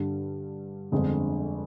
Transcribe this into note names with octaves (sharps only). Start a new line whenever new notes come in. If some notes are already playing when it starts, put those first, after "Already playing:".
Already playing: G2 D3 G3
G1 F2 D3 G#3 C4